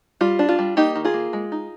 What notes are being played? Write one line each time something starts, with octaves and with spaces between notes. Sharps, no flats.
G3 F4
D4
F4
G3
A#3 D#4 G4
D#3
F4 G#4
A#3
G#3
D#4